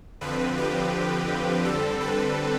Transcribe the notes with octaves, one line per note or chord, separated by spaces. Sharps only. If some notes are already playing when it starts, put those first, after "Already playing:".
F2 D3 F3 C4 B4
G4
D3 G3 C4 A4
B4